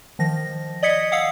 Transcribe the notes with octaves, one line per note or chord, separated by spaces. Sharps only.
D#3 F3 A#6
D5 D#5 D#6 G#6 B6 C#7
F5 F#5 D#6 E6 C7 C#7